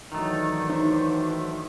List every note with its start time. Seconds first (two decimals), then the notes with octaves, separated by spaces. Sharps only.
0.12 D#3 E3 F#3 A3 D4 D#4
0.70 D#4 C5 E5